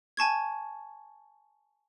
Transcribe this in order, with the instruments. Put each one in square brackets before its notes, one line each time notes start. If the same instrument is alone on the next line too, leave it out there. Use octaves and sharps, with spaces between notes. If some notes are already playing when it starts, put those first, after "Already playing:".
[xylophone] G#5 A5 C#6 G#6